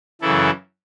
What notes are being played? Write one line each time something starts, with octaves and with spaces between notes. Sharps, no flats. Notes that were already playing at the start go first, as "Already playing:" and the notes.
F#2 C#3 E3 E4 A4